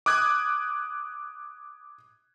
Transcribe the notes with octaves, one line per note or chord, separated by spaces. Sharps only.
D6 D#6 F#6 G#6